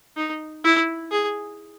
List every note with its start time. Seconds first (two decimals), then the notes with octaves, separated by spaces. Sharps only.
0.16 D#4
0.64 E4
1.11 G#4